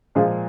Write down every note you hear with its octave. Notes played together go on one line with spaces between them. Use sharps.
A#2 F3 G#3 F4 G#4